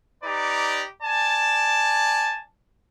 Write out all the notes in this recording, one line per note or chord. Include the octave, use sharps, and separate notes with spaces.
D#4 G4 B4 D5 A#5
D5 G#5 A5